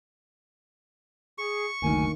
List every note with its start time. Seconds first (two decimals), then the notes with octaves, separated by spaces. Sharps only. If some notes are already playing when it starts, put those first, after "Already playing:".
1.38 G#4 C#6
1.82 F#1 D2 D#3 A#3 D#4 G#5